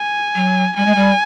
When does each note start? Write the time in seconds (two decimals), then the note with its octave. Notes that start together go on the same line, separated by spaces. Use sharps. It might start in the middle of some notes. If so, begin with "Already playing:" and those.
Already playing: G#5
0.35 F#3
0.77 G3 G#5
0.86 G#3
0.95 G3